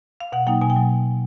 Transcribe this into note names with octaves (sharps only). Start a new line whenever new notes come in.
F5
B2 F#5
F#3 A#3 D#4 G5
B2 G#5
G5
F#3